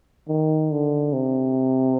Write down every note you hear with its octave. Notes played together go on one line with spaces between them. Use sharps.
D#3
D3
C3